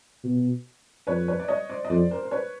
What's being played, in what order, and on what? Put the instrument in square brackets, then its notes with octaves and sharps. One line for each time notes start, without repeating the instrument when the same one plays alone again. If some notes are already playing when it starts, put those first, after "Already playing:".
[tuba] B2
[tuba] F2 [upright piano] B4 C#5
[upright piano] B4 C#5
D5
C#5 D#5
C5 D5
D#5
[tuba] F2 [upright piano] C5 D5
[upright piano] A#4 C5
C5
B4 C#5